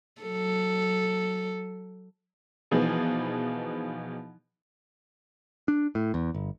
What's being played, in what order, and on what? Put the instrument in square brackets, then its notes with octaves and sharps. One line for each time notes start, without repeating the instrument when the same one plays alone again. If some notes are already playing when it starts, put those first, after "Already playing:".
[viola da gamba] F#3 A4
[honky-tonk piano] B2 E3 F3 D#4 G#4
[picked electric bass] D4
A2
E2
G1